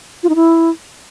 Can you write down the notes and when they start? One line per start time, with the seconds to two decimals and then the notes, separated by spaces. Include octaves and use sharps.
0.23 F4
0.29 D#4
0.35 E4